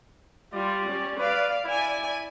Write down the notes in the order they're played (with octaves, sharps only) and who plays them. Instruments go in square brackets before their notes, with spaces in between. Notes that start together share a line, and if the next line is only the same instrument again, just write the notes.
[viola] G3 F4 [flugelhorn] D5
[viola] G3 C#4
[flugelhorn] B4 [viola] D5 F5
[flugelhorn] E4 [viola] D5 G#5